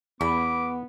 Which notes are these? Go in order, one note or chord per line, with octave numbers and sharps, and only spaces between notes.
E2 B3 B5 D6